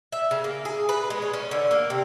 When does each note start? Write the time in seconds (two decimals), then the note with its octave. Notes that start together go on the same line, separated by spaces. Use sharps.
0.12 E5
0.31 C#3
0.44 A#3
0.65 G#4
0.89 B4
1.10 G#3
1.22 C#5
1.34 C#4
1.51 D3
1.71 A#3
1.90 C3